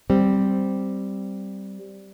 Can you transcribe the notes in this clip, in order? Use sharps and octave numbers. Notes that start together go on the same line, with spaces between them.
G3 C4